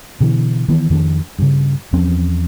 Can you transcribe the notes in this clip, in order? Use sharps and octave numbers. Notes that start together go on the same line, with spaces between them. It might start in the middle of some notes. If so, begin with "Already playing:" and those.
B2 D3 E3
D#3 E3 B3
F2 D#3 B3 D4
G2 C#3
E2 F3 C4 C#4